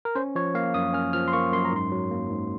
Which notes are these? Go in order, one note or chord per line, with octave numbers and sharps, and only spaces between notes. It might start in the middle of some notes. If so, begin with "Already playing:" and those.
A#4
C#4 C5
F3 C#5
A#3 F5
F#2 D#6
C#4 F6
F3 F6
C6
A#3 C#6
F#2 C6
A#5
G#2 C6
F#3
A#3
G#2